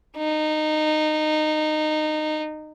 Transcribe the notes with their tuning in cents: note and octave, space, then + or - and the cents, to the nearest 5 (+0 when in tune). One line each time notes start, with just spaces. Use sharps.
D#4 -15